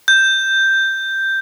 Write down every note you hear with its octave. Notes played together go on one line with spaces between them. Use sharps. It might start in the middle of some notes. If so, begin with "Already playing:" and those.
G6